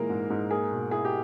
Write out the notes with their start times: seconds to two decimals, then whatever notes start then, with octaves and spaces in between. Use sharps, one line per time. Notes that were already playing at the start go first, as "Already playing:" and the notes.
Already playing: A#2 E3 G#3 A#3 A#4
0.10 G#2
0.30 G#2
0.51 A#3 G#4
0.71 B2
0.91 E4 G#4
1.05 G4